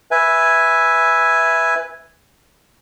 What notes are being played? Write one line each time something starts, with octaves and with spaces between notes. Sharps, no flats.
B4 E5 G#5